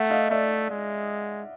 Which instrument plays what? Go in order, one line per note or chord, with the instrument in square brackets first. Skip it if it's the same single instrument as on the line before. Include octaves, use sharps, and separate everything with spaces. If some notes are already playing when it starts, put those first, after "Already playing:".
Already playing: [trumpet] A3 [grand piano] E5 F#5
[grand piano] D#5 F5
[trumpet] A3 [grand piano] D5 E5
[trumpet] G#3